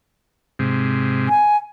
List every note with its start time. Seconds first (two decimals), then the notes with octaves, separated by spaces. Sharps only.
0.59 G#2 C3
1.29 G#5